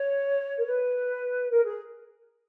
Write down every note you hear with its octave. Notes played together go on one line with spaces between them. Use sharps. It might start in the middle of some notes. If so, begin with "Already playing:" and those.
Already playing: C#5
A#4
B4
A#4
G#4